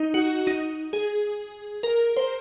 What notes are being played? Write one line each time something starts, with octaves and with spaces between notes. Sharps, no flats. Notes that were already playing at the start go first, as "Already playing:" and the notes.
Already playing: D#4
F#4
D#4
G#4
A#4
C5